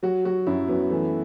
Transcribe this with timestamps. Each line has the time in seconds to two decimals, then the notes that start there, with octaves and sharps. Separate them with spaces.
0.03 F#3 F#4
0.25 F#3 F#4
0.47 F#2 E4
0.68 F#2 B3
0.90 E3 A3